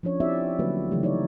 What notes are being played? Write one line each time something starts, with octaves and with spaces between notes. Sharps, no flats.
F3 C#4 D4 C#5
C4 D#4 E4 G4 D5 E5
D3 F#3 A3 A#3 F#4 B4
C#3 E3 F#3 A3 G4
D#4 C#5 D5